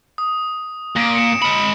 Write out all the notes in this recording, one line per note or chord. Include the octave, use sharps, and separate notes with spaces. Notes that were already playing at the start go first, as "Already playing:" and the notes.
D#6
A#2 A#6 D7
C#7 E7
G#3 B5 C#7